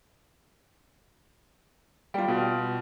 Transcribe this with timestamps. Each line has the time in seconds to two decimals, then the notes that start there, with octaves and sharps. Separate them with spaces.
2.14 G3 F4 G5
2.28 B2